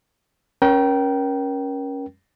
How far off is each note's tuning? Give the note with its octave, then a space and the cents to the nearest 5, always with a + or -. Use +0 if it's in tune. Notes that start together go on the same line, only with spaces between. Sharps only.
C#4 +0 A#4 +35 G5 -20